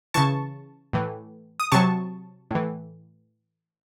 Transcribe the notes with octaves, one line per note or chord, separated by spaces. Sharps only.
C#3 E3 A5 C#6
A2 E3
D#6
C3 F#3 A5 C#6
A2 E3